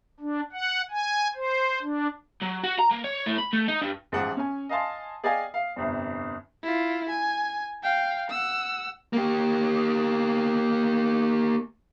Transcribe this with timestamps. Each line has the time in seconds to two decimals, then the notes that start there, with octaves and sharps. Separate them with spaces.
0.20 D4
0.52 F#5
0.90 G#5
1.35 C5
1.82 D4
2.42 F#3
2.63 F#4
2.79 A#5
2.91 A#3
3.04 C#5
3.26 A2
3.38 B5
3.53 A3
3.68 D#4
3.81 G2
4.12 A1 G#2 F3 F#5
4.37 C#4 G#5
4.69 D#5 F5 G#5 A5 C6
5.24 G#4 D5 D#5 F5 G5 G#5
5.54 F5
5.76 G1 C2 F2
6.63 E4 F4
7.09 G#5
7.83 F5 G5
8.30 F#5 E6
9.13 A#3 G4